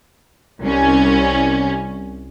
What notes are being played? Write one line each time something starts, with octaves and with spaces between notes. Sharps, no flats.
C2 C#4